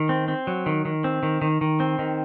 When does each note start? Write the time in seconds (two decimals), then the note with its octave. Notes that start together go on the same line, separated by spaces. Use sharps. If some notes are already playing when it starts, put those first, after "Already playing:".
Already playing: D#3
0.09 C4
0.28 C4
0.47 F#3
0.66 D#3
0.85 D#3
1.04 C4
1.23 D#3
1.42 D#3
1.61 D#3
1.80 C4
1.99 D#3